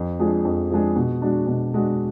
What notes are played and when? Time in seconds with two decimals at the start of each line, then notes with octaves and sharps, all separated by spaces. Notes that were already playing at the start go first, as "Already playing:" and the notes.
Already playing: F2
0.19 F3 G#3 D4 G#4
0.45 F2
0.70 F3 G#3 D4 G#4
0.96 B2
1.22 G#3 D4 F#4
1.47 B2
1.74 G#3 D4 F#4